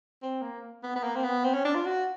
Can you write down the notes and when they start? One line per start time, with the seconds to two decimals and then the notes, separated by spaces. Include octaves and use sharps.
0.22 C4
0.42 A#3
0.83 B3
0.96 B3
1.03 A#3
1.16 C4
1.24 B3
1.44 C4
1.54 C#4
1.65 D4
1.75 F4
1.85 F#4